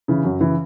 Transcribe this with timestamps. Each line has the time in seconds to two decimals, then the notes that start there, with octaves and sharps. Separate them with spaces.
0.08 C#3 E3
0.24 F#2
0.41 C#3 E3